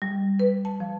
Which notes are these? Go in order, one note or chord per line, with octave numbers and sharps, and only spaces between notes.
G3
B4
A5
F3